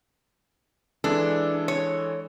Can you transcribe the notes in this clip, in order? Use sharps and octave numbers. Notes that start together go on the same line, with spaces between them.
E3 G#3 D4 A4
C#5